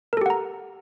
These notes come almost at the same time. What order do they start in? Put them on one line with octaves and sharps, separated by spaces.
A#4 A4 G4 F#5 A#5